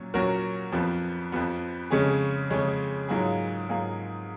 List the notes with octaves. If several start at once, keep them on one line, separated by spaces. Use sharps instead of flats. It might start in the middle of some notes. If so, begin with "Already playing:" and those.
Already playing: A#2 F#3 C#4
A#2 F#3 C#4 F#4 A#4
F2 F3 B3
F2 F3 B3
F2 C#3 G#3 C#4 G#4
F2 C#3 G#3 C#4 G#4
G#2 F#3 A#3 F4 G#4
G#2 F#3 A#3 F4 G#4